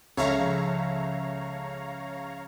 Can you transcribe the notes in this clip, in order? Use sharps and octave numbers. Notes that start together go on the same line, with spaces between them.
C#2 C#3 F3 A4 C#5 E5 F5 A#5